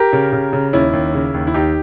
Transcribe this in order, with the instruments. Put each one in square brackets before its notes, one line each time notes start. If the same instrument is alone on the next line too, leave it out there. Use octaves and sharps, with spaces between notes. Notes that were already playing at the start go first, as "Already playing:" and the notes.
Already playing: [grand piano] G4 A#4
C#3
C#3
C#3
D#2 C#4 E4
D#2
C#3
D#2
E4
D#2 D#4 G4